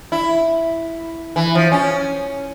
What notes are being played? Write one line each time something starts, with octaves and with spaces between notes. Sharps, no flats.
E4
E3
F3
C#4